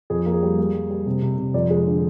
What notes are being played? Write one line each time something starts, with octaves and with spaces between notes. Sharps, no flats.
F2 G#4
A#3
G#4
G3
A#3
G3
G3
C3
C3
C3
F2 D5
G#3
D3